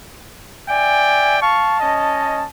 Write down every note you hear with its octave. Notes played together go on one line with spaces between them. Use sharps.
D5 E5 G5 G#5
F5 A5 C#6
C#4 D#5